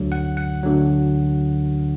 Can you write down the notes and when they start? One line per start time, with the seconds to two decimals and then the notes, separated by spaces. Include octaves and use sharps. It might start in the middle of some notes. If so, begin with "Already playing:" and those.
Already playing: D2 D3 F#3
0.12 F#5
0.37 F#5
0.63 D2 D3 F#3